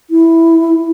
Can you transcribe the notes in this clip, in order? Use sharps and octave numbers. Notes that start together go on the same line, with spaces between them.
E4